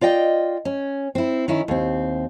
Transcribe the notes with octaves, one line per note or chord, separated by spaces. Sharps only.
F4 D5 D#5 G5
C#4
C4 E4
D#3 C#4 E4
D#2 C4